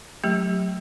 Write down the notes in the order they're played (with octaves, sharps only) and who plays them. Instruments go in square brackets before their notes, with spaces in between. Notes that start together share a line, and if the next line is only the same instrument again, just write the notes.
[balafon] F#3 A3 G4